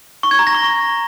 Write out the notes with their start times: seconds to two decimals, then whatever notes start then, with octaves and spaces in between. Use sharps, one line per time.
0.23 C#6
0.31 G#6
0.39 A#5
0.47 A#6
0.55 C#6